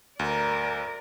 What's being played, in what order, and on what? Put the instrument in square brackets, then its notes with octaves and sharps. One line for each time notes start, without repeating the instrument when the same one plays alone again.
[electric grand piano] D2 [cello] A#4 D5